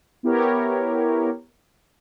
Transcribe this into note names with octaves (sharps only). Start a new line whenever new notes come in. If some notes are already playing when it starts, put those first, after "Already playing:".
B3 E4 G4 A#4 C#5